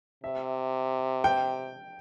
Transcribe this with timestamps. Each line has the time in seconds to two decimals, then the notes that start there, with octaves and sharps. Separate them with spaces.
0.23 C3 E5
1.24 G5